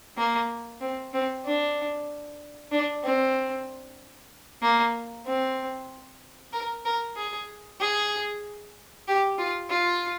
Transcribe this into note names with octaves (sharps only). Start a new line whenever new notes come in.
A#3
C4
C4
D4
D4
C4
A#3
C4
A#4
A#4
G#4
G#4
G4
F4
F4